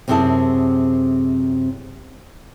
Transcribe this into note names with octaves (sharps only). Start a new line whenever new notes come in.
F#2 C3 C4 E4 G#4 A5